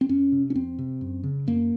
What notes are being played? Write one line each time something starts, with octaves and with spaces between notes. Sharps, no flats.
C4
F2 C#4
C3
C#4
F2 C4
C3
F#2
C#3
F#2 A#3